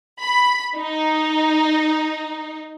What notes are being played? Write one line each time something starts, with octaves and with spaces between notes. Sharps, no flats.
B5
D#4